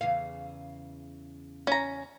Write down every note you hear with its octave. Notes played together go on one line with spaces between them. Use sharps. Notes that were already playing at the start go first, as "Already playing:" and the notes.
E2 C#3 F5
C#4 A#5